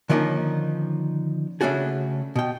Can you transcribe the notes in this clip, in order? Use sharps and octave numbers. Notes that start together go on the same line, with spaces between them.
D3 D#3 F3 A#3 C#4 D#4
C#3 A3 C#4 D4 F#4 G#4
B2 G5